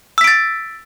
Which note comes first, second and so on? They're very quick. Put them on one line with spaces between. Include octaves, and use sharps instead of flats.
E6 B6 D7 A6